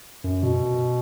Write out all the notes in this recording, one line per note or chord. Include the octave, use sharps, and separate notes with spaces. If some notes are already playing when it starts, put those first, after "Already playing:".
F#2
B2